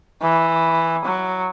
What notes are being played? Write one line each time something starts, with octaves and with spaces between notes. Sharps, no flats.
E3
F#3